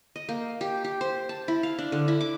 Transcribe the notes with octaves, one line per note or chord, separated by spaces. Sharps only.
D#5
A#3
G4
G4
C5
A5
E4
F5
D4
D3
E4
D6